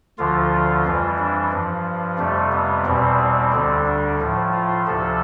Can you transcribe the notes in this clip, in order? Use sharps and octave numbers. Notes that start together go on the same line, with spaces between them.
D2 D3 F3 F4
F2 E3 G3
D4
G2 F3
F2 C3 G3 A3
B3
E2 B2 G3 C4
D2 D3 G3
D4
A2 F3
F4
D2 C3 F3 A4